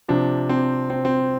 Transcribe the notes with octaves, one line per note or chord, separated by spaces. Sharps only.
C3 F3 D4
C4
C4
C4